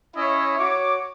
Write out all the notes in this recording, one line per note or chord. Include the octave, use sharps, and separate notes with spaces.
C#4 E4 C#5 D#5 E5
F#4 C#5 D6